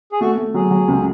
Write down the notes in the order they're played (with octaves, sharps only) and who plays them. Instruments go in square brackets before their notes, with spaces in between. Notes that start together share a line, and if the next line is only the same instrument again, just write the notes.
[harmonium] G#4
[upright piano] A3 [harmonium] F#4
[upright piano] A3
[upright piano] F#3 [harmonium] G#4
[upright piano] F#3
C#2